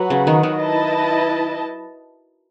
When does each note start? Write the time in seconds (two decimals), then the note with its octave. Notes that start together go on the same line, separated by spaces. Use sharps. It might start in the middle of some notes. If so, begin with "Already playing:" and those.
Already playing: F#3 F#4 B4 F#5
0.10 C#3
0.27 D#3
0.43 D#3
0.60 E4 B4 D#5 A5